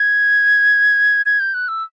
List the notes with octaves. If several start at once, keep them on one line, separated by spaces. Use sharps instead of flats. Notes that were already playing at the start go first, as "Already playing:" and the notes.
Already playing: G#6
G#6
G6
F#6
E6